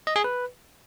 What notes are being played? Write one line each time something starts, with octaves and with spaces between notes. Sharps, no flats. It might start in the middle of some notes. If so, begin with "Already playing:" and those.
D#5
G#4
B4